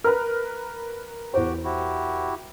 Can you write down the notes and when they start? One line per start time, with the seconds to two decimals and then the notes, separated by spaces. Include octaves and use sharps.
0.04 A#4 B4 F6
1.34 E2 F#4 G4 C5 G5
1.64 E4 F#4 G4